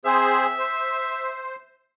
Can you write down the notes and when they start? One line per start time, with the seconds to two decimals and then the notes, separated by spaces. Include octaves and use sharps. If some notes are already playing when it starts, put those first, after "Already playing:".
0.05 C4 G#4 C5 E5
0.58 C5